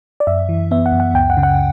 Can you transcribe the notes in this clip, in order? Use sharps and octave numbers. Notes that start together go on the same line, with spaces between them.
D5
F#2 E5
E3
B3 E5
F#5
F#2
F#5
C#2 G5
F#5
C#3
F#5